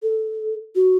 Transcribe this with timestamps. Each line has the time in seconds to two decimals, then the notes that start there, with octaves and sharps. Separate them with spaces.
0.03 A4
0.75 F#4